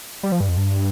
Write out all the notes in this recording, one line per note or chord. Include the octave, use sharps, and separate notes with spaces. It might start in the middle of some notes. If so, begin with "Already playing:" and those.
G3
F3
G2
F2
G2